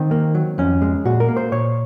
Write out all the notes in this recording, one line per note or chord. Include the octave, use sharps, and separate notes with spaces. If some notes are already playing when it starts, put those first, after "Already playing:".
Already playing: D#3 C4
A#3
F#3
F2 C#4
G#3
A#2 F#4
A#4
A#3
C5
A#2 C#5